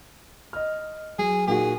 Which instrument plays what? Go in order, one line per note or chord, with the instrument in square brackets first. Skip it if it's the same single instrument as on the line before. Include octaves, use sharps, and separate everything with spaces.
[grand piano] D#5 F6
[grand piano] F#3 [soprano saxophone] G#4
[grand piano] A#2 D#4 F#4 [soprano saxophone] G#4